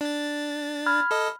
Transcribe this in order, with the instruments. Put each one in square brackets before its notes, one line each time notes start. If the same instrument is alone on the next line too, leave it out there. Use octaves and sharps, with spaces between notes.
[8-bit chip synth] D4 A6
[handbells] B5 F6 G#6
[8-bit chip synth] A4 D#5